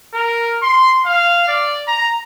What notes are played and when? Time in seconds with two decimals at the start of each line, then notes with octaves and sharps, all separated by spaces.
0.14 A#4
0.62 C6
1.06 F5
1.48 D5
1.88 A#5